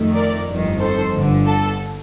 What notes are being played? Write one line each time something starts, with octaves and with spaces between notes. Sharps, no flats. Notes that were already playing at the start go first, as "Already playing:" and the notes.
Already playing: F2 D#3 A3
A#4 D5
G1 F2 D#3
A4 C5
G1 G2 D3
A4